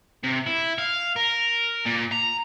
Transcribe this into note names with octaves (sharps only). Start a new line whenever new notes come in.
C3
E4
F5
A#4
A#2
A#5